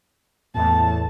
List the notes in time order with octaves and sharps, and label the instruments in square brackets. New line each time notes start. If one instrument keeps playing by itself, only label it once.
[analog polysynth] E2 A2 [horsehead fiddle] A3 A5